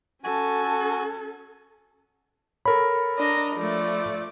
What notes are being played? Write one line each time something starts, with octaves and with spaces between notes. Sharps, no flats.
C#4 F#4 A4 G#5
A4 A#4 C#5 B5
D4 D#5 A#5
F3 A3 D5